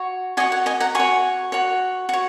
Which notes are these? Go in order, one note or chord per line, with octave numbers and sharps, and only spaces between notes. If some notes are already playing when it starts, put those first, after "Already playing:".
Already playing: F#4 C#5
F#4 C#5 D#5 G#5
F#5
D#5 G#5
F#5 A#5
F#4 C#5 G#5 C#6
F#4 C#5
F#4 C#5